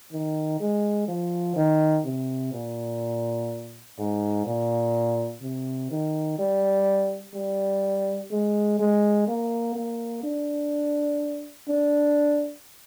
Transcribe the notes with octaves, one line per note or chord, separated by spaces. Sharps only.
D#3
G#3
F3
D#3
C3
A#2
G#2
A#2
C3
D#3
G3
G3
G#3
G#3
A#3
A#3
D4
D4